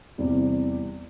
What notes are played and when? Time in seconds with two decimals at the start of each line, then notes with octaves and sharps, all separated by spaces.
0.18 E2 C3 G3